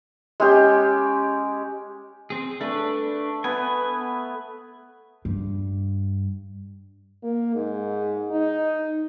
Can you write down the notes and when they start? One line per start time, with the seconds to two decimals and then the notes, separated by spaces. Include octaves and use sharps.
0.40 G#3 C#4 G4
2.30 C4 G#4
2.61 A3 D4 B4
3.44 B3 B4 G#5
5.25 G2
7.23 A#3
7.55 G#2
8.31 D#4